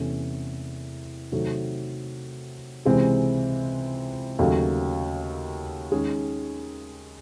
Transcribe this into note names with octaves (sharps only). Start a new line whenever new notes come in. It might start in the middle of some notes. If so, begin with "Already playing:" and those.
Already playing: E2 C3 E3 A3 C#4
C3 D#3 F#3 A3 C4
C#2 C3 E3 G#3 C4
D#2 C#3 F#3 A3
D#3 G#3 C#4 G#4